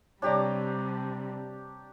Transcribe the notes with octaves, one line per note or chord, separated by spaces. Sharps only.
C3 G3 D4 G4 C#5 D5 A#5